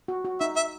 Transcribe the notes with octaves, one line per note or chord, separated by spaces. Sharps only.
F#4
F#4
D#4 E5
E5